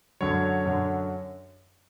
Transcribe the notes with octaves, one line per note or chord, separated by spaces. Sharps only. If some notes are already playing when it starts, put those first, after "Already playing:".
F#2 D3 F#3 C#5
F#2 D3 F#3